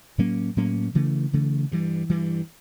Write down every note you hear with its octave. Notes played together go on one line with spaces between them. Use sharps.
A2 F#3 A#3 C#4
A2 F#3 A#3 C#4
C#3 E3 A3
C#3 E3 A3
G2 E3 G3
G2 E3 G3